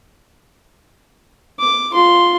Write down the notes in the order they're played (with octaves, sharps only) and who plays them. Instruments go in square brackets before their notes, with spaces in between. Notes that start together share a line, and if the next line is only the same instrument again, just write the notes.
[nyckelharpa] D6
F4 C6